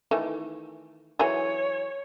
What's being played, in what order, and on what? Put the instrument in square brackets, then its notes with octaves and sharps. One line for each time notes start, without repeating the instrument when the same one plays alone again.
[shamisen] D#3 E3 A3
[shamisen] E3 F#3 G#4 [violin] C#5